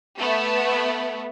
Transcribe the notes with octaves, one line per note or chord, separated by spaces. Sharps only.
A3 B3